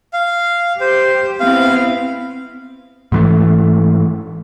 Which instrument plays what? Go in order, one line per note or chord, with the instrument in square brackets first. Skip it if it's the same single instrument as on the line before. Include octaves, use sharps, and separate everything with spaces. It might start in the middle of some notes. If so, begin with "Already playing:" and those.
[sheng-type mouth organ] F5
[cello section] G4 [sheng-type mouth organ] C5
[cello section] B3 C4 E4 [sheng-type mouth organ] F5
[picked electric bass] G#2 E3 A3